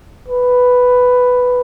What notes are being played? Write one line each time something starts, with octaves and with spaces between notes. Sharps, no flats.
B4